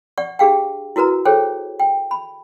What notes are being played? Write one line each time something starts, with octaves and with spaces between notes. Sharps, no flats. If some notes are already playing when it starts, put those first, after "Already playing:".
D5 F#5 C#6
D4 G4 G#4 F5 G5
E4 F#4 A#4 B4 A#5
G#4 A4 C5 C#5 G5
G5
B5